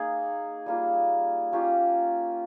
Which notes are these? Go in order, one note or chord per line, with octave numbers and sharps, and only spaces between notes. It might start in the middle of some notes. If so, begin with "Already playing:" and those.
Already playing: A#3 D#4 G#4
G3 A#3 F4
A#3 C#4 F4 G4